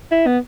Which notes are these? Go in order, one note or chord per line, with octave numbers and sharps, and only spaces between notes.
E4
B3